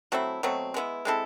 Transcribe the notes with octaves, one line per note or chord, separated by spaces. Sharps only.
F#3 A3 C4 E4
B2 F#3 A3 C4
G#3 B3 E4
G#3 C4 E4 A4